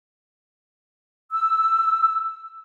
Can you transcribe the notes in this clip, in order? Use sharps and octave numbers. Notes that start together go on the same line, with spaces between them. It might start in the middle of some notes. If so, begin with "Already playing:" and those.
E6